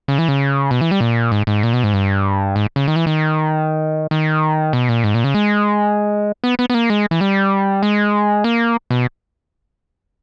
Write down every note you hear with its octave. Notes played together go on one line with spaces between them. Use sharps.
C#3
E3
C#3
B2
E3
G3
A#2
G#2
G#2
A#2
B2
G#2
G2
G#2
C#3
D#3
E3
D#3
D#3
B2
A#2
G#2
A#2
C#3
G#3
B3
B3
B3
A#3
G#3
E3
G3
G#3
A#3
B2